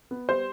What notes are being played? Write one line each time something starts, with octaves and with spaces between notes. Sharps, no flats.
B3
G3 C5